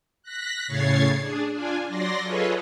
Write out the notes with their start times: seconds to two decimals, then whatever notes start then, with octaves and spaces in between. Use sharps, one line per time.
0.23 F#6 A#6 B6
0.68 A2 C#3 C#5 G#6 A6 C7
1.19 D4 G#4
1.52 D4 F4 G#5
1.88 F#3 D5 C6 A#6
2.22 F4 G#4 A4 B4 C#5 D#5